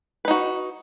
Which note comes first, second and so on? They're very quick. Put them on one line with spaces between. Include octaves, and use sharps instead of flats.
B4 D#4 F#4